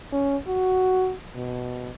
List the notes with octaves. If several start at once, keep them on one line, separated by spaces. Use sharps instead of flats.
C#4
F#4
B2